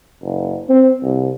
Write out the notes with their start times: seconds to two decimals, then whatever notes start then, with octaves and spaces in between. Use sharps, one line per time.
0.22 F#1
0.69 C4
1.03 C2